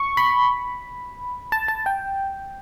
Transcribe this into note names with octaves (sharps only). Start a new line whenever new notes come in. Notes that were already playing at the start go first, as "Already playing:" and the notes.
Already playing: C#6
B5
A5
A5
G5